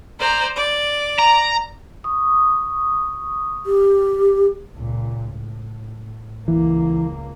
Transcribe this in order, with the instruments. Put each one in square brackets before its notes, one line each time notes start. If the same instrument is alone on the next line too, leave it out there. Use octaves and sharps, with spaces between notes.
[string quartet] C5 D5 A#5
D5
[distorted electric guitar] A#5
[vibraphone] C#6 D#6
[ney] G4
[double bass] C#2 A#2
A2
[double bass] C#2 A#3 [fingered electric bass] E3